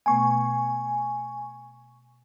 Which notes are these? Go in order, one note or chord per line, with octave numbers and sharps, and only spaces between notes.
B2 A3 B3 G#5 C#6